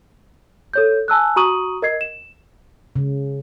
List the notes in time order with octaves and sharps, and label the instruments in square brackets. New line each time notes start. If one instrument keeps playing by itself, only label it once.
[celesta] A4 C#5 G6
G#5 A5 E6 F#6
F#4 A#5 C#6 D#6 D#7 F#7
A#4 D#5 G#6 C7
E7
[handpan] C#3